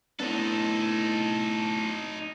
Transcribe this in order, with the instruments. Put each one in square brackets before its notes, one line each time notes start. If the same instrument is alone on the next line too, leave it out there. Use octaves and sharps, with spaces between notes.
[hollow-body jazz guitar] A2 B3 D4 [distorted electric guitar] D#4 A4